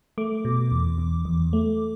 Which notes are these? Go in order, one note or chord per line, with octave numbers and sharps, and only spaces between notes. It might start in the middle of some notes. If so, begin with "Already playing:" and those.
A3 D6
B2
E2
E2
E2
A3